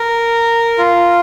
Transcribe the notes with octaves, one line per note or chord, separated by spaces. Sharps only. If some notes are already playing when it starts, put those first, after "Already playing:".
Already playing: A#4
F4